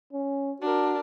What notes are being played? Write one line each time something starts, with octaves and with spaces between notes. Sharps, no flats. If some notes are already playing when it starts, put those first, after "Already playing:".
C#4
D4 F#4 A#4